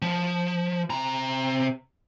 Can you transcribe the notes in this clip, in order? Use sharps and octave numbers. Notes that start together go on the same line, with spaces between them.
F3
C3 A#5